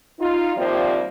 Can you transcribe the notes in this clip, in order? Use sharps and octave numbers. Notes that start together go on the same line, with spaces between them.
D#4 F4
D#2 C3 F3 G3 A#3 D5